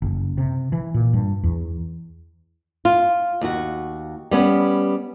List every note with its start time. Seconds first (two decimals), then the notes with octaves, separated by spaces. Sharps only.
0.02 F#1
0.38 C3
0.72 E3
0.94 A#2
1.14 G2
1.44 E2
2.85 F4
3.41 D#2 F#4
4.31 G3 B3 C#4